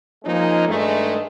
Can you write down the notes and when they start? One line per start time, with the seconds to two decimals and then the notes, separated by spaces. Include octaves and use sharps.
0.25 F3 G#3 A#3 C#4 D#4
0.68 G2 D#3 G#3 A3